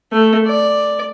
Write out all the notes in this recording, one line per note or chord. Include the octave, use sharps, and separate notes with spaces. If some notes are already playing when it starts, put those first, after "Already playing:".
A3
D5